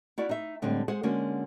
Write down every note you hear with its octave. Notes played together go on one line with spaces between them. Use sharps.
E4 F#4 D5 F5
D#4 E5
A2 D3 G3 G#3 C4
G#3 G#4 C5 F#5
D3 G#3 A#3 C#4 F#4